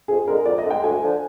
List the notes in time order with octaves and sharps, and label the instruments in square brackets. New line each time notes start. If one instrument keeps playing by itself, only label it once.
[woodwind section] F2 [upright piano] G#4
[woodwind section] D3 G#3 [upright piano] A#4
[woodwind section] F2 [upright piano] D5
[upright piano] D#5
[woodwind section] D3
[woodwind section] G#3 [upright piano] G5
[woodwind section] D2 [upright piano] G#5
[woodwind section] D3 F3